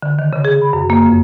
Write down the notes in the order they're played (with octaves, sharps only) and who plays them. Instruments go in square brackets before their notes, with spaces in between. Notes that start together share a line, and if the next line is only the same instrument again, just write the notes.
[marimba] D3
D#3
C#3
G#4
B5
F#2
A#3
F2